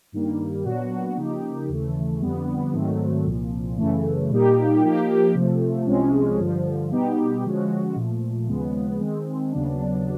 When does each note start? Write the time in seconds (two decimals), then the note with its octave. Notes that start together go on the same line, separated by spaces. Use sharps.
0.12 G2 D#3 G3 A#3
0.64 A#2 F#3 B3 D4 F#4
1.16 C#3 F3 A#3 D#4 G4
1.68 D#2 C#3 E3 A3
2.21 F2 D3 G3 B3
2.73 G#2 D#3 F#3 A3 C4
3.25 C2 A#2 F3
3.77 F#2 C#3 E3 A3
4.30 A#2 G3 A#3 D#4 G4
4.83 F3 A#3 D#4 G4
5.34 C3 F3 A3
5.86 C2 C3 F3 G#3 C#4
6.39 G2 D3 F3
6.91 B2 G3 B3 D#4 G4
7.43 D3 F3 G#3 C#4 F#4
7.96 A#2 F3 A3
8.47 D#2 C#3 F3 G#3 B3
9.00 D#3 G#3 C4
9.51 D#2 C#3 F#3 B3 D4